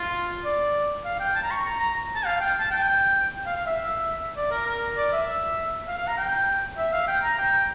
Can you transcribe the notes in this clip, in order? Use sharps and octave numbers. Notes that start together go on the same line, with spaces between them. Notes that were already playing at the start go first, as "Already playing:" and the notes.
Already playing: F4
D5
F5
G5
A5
A#5
C#6
A#5
A#5
A5
F5
G5
A5
G5
F5
F5
E5
D5
A#4
A#4
D5
E5
F5
F5
A#5
G5
E5
F5
G5
A#5
G5